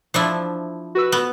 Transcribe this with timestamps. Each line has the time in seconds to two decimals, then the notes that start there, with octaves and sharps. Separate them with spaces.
0.14 F3 D4 E4
0.95 F#4 B4 E6
1.12 B3